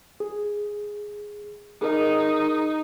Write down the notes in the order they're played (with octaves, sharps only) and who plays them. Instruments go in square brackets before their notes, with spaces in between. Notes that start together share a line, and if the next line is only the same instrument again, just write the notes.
[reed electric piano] G#4
[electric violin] D#4 [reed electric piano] G#4 A#4 D#5